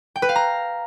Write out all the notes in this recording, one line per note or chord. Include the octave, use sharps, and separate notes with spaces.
G5
B4
F5
A#5